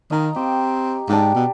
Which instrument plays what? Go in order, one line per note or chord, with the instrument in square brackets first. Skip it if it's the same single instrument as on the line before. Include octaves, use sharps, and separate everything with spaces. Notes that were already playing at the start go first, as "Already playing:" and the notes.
[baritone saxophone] D#3 [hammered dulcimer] D#5 A#5
[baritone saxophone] C4 [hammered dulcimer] G4
[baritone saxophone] G#2 [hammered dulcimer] D4 G4
[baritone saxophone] B2